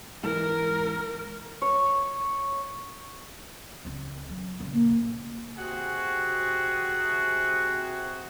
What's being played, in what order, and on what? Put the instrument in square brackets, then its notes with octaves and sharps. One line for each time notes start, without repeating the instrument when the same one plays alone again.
[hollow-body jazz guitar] G#2 E3 [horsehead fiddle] A#4
[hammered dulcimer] C#5
[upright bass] C#2 C4
F#3
C#2 A#2
[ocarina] A#3
[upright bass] A#2
[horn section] C3 F#4 G#4